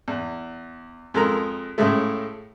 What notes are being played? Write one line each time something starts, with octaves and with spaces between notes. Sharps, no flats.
E2
F2 G#3 A4 A#4 A#5
A2 C#3 G#3 A3